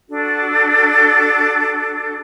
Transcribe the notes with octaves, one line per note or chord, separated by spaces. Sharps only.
D4 F#4 A4